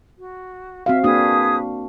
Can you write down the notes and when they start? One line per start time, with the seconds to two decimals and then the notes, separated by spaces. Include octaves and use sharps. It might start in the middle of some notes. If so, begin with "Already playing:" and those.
0.18 F#4
0.86 C4 F#4 E5 F5
1.04 A#3 D4 F#4 G#4 B4 D#6